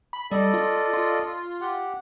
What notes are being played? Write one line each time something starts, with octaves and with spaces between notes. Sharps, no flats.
B5
G3 A4 D5 D#5
F4
F4
G4 F#5